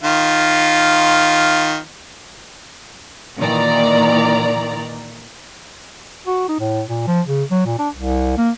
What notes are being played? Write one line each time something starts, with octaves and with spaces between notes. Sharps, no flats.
D#3 F4
A#2 D#3 E3 D5 A#5
F#4
D#4
A2
A#2
F3
C#3
F#3
A#2
D4
C2
A#3